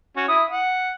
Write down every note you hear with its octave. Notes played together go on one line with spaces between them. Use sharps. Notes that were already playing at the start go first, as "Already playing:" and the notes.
C#4 F#4
E4 D#6
F#5